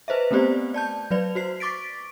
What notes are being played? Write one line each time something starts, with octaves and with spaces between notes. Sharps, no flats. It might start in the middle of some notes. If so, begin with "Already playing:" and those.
B4 C5 D#5 E5
A3 B3 C4 G4 C5 D5
D5 A5 G6
F#3 B4 D5 F7
F#4 C5 C7
C#6 D6 A6 B6 D7